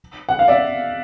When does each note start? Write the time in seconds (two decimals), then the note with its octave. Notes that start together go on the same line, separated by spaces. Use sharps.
0.29 F#5
0.39 F5
0.48 D5 E5